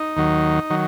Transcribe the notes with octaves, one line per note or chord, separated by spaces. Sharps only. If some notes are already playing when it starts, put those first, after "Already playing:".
Already playing: D#4
D#2 D#3 F#3
D#3 F#3